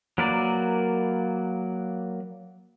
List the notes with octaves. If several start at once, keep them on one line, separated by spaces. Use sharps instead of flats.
F#3 A#3 A#4 B4 D5